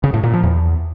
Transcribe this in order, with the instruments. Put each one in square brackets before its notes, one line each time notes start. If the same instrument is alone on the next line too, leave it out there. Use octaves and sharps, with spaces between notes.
[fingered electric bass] C#3
A2
A#2
F3
E2